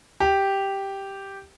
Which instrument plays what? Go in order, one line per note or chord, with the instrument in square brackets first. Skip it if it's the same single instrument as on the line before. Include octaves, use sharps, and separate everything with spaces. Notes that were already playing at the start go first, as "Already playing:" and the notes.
[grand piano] G4